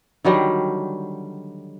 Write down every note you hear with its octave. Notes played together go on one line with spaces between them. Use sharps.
D3 D#3 F#3 G3